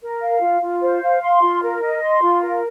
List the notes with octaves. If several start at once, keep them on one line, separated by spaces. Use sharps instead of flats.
A#4
F5
F4
F4
C5
F5
C6
F4
A#4
D#5
C6
F4
A#4